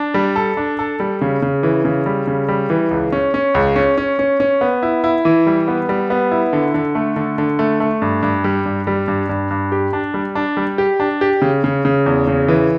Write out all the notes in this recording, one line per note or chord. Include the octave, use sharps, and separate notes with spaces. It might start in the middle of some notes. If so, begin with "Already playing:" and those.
Already playing: D4
G3
A4
D4
A4
G3
C#3
C#3
E3
C#3
G3
C#3
G3
E3
C#2
C#4
C#4
C#2
C#4
C#4
C#4
C#4
B3
E4
E4
E3
G3
B3
G3
B3
E4
D3
D3
A3
D3
D3
A3
A3
G2
G2
G3
G2
G3
G2
G2
G2
G4
D4
G3
D4
G3
G4
D4
G4
C#3
C#3
C#3
E2
C#3
E3